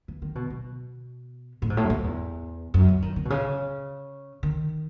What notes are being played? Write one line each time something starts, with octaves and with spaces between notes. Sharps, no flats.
E3
D#3
B2
B2
A2
G#2
A2
F#2
G#2
E2
F#2
E3
D#3
D#3
B2
C#3
D#3